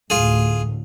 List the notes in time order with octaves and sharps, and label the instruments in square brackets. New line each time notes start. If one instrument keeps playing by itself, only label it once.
[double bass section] D2 A2 [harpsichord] F4 G#4